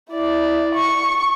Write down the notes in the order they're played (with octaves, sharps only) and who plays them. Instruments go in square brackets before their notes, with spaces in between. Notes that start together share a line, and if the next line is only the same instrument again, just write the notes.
[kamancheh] E4 D5
C#6